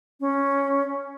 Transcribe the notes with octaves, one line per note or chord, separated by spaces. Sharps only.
C#4